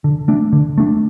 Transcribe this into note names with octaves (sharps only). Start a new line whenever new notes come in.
D3
A3 D4
D3
A3 D4